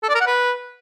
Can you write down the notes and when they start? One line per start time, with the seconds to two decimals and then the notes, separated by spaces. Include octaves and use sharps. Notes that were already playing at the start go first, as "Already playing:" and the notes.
0.03 A4
0.09 D5
0.15 A#4
0.21 F#5
0.26 B4